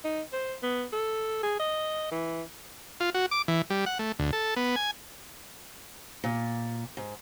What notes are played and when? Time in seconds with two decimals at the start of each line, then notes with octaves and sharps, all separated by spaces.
0.05 D#4
0.33 C5
0.63 B3
0.93 A4
1.43 G#4
1.60 D#5
2.12 E3
3.00 F4
3.14 F#4
3.31 D6
3.48 E3
3.70 G3
3.86 F#5
3.99 A3
4.19 D2
4.33 A4
4.56 B3
4.76 G#5
6.24 A#2
6.97 G#2